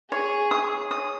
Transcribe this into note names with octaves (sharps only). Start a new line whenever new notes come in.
G#4 C#5
D#6
D#6